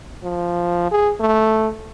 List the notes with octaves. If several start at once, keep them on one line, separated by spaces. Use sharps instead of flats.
F3
G#4
A3